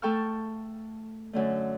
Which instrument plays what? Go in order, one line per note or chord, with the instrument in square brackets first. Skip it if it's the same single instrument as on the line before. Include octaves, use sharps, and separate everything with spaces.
[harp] A3 A4 G5 A5 C#6 F6
F#2 D3 A3